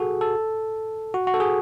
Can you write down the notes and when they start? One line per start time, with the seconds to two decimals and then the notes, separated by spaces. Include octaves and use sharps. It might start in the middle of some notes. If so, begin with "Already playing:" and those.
Already playing: F#4 G#4 A4
0.21 A4
1.14 F#4
1.27 F#4
1.34 A4
1.40 G#4